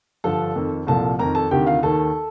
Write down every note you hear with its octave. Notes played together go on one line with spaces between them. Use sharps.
G2 D3 F3 A4 A5
F2 D#3
C2 A#2 F3 A4 A5
F2 D#3 A#4 A#5
A4 A5
D2 C3 D#3 G4 G5
F4 F5
D#2 D#3 A4 A5